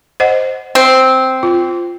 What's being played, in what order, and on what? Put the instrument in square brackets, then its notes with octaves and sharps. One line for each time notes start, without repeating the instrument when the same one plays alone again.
[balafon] C5 D#5 F#5
[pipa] C4
[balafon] F4